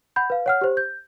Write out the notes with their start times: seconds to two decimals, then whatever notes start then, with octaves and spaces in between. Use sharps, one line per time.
0.16 F#5 B5 G6
0.30 B4 F5
0.46 C#5 F#5 F6
0.61 G4 C5
0.77 G6